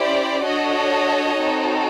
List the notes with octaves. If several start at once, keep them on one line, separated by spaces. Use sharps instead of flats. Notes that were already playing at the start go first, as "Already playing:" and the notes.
Already playing: C#4 E4 G4 C5 D5
D4 F#4 A4 C#5 D#5
C4 D#4 F#4 A4